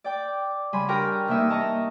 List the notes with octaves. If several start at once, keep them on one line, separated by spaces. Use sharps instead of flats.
D5 G5 D6
C#3 G3 G#5 B5 C6
D4 G4 A#4 G5 A#5 C#6
C3 E3 A#3 D#4 E5 C#6
A#4 D#5 A5 A#5 C#6